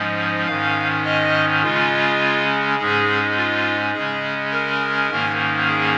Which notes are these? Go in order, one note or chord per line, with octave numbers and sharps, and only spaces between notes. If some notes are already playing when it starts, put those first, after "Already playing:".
Already playing: G#2 F3 G#3 C#4
G#2 D#3 C#4 F5
D#5
C#3 G#3 C#4 F4
G#2 G#3 C#4 G#4
F4
C#3 G#3 C#4 G#4
A#4
G#2 D#3 A#3 C#4
G#4